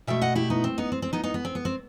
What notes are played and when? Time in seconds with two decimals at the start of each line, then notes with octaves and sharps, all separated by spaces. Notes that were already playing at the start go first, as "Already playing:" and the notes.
0.07 B2 A3 E5 G5
0.21 D#5 F#5
0.35 E4 G4
0.50 B3 D#4
0.64 C4
0.78 B3 D#4
0.92 C4
1.02 C4
1.13 B3 D#4
1.24 B3 D#4
1.34 B3
1.45 C4
1.55 B3
1.65 C4